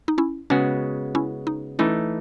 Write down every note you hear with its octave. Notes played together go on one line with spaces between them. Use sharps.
D#4
C#4 E4
C#3 G#3 B3 C#4 F#4
C#4 E4
D#4
E3 A3 C#4 D#4 E4